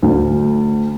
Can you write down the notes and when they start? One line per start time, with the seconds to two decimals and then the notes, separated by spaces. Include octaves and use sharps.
0.03 D2